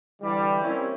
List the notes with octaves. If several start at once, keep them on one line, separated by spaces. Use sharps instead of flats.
D3 E3 G3
G3 A#3 C4 C#4 E4